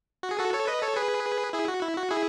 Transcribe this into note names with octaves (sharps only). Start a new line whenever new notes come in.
F#4
G#4
F#4 A4
A4 C#5
B4 D#5
A4 C#5
G#4 B4
E4 G#4
F#4
E4
F#4
E4 G#4